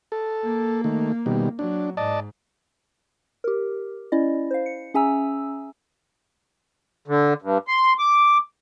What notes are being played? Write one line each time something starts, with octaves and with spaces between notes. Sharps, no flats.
A4
A#3
D#3 A3
B2 D#3 G3
F#3 D4
G#2 D5 D#5 A5
G4 A#4
C#4 E4 D5 D#5
C5 F5
C#7
C#4 G#4 E5 G#5 A#5 E6
D3
G2
C6
D6